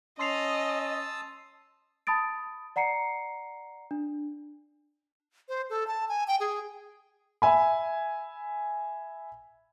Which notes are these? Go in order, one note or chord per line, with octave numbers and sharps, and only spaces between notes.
C#4 D#5 A5 C6 D#6 E6 C7 F7
A5 B5 D#6 A6 D7
D5 F#5 A#5 C7 C#7
D4
C5
A4
A5
G#5
G5
G#4
E5 G#5 B5